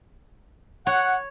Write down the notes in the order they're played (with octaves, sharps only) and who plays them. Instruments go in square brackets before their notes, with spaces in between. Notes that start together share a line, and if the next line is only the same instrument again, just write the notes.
[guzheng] C#5 [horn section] F#5